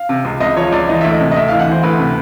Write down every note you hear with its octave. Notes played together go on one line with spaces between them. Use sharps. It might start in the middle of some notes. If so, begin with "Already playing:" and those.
Already playing: F5
C3
C#2
C#2 D#5
F3 C#5
C#2 D5
E3 D#5
D2 E5
D#5
C3
D#5
D2 E5
E3 F5
F#5
E3 C5
D2 B4
C3